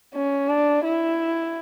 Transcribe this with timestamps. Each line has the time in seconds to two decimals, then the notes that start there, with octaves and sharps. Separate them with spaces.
0.15 C#4
0.49 D4
0.85 E4